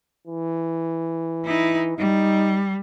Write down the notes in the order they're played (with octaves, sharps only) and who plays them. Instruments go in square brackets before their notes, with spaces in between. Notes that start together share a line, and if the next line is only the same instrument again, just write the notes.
[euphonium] E3
[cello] D#4 E4
[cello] G3 [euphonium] D#4